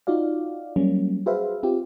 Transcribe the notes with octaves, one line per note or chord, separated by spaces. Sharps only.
D#4 F4 F#4 D5 F5
F#3 G3 A#3 C#4
F#4 G#4 B4 C5 E5 F5
C4 F4 G4